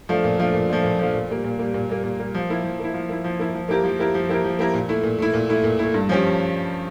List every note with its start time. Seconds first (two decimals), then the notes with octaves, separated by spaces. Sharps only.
0.09 F3 A3 D4 F4
0.24 A#2
0.39 F3 A3 D4 F4
0.54 A#2
0.69 F3 A3 D4 F4
0.84 A#2
0.99 F3 A3 D4 F4
1.14 A#2
1.29 G3 A#3
1.44 A#2
1.59 G3 A#3
1.74 A#2
1.89 G3 A#3
2.04 A#2
2.20 G3 A#3
2.34 F3
2.50 A#3 E4
2.64 F3
2.79 A#3 E4
2.94 F3
3.09 A#3 E4
3.24 F3
3.39 A#3 E4
3.55 F3
3.69 A#3 E4 G4 A#4
3.84 F3
3.99 A#3 E4 G4 A#4
4.14 F3
4.29 A#3 E4 G4 A#4
4.44 F3
4.59 A#3 E4 G4 A#4
4.74 A#2
4.89 A3 E4
5.04 A#2
5.19 A3 E4
5.34 A#2
5.49 A3 E4
5.64 A#2
5.79 A3 E4
5.94 G2
6.09 F3 C#4 G4